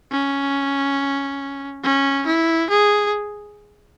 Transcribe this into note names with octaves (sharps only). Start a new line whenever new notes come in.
C#4
C#4
E4
G#4